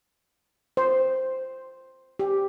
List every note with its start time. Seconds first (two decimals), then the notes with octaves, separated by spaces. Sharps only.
0.77 C5
2.19 G4